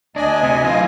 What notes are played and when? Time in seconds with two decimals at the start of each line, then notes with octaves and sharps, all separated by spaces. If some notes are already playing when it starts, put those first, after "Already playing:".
0.16 D2 D4 D#5 G#5
0.43 C3
0.64 E3 F4